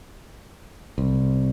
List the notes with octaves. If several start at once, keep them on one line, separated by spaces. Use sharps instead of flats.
C2